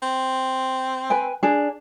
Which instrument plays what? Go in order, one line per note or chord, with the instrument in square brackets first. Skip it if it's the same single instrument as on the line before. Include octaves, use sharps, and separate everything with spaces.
[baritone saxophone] C4
[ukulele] B4 G5 G#5
D4 G#4